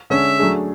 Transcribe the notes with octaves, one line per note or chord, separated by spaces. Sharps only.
D3 G#3 C#4 E5
F#3 A3 D4 G#4